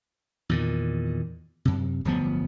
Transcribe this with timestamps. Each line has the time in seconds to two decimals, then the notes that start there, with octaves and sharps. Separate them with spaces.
0.49 E2 A#2 D#3
1.65 F#2 C3
2.05 D1 G1 F3 B3